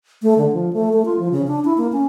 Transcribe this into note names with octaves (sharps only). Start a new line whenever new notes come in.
A3
D3
F3
A3
A3
F4
F3
C#3
D4
E4
A#3
C#4